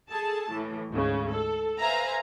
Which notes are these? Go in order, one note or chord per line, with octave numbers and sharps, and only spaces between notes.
G#4 A4 A5
A2 E3
D2 G#2 C#3
A4
B4 C5 E5 F5 G#5 A#5